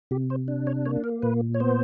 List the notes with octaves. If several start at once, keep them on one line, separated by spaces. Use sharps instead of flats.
C3 G4
C5
D4
C#5
A#3 C#5
A#4
A#2 B4
C#5
B3 C5